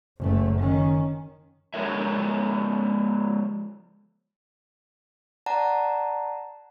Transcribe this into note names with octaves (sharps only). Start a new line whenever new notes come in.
F#1 A3
D#3 C#4
F3 G#3 A4 A#4 C#5 E5
D5 F#5 A5 A#5